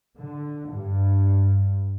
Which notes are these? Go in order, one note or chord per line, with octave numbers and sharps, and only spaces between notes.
D3
G2